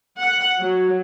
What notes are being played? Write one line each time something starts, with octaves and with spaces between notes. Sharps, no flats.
F#5
F#3